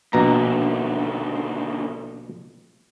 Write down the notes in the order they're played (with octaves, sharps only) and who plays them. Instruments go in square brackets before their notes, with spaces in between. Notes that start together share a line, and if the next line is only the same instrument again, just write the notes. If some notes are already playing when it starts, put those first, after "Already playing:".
[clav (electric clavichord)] A#1 B2 A#5 [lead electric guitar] D#2 D3